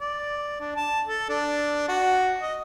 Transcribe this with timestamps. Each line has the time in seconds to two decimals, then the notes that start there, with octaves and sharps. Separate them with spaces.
0.01 D5
0.60 D4
0.76 A5
1.07 A4
1.29 D4
1.88 F#4
2.41 D#5